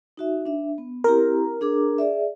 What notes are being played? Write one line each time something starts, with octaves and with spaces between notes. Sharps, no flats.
D#4 F#4 E5
D4 E5
B3
C4 E4 G4 A#4
D4 G#4 D6
G#4 D5 E5